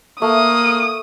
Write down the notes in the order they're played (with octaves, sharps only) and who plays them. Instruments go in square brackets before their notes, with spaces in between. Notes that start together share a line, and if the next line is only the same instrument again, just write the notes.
[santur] A3 [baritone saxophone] A#3 [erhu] D#6